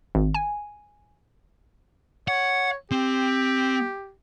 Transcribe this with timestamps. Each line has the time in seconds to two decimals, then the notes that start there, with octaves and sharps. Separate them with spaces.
0.15 G#1
0.34 G#5
2.28 C#5 F#5
2.91 C4 G4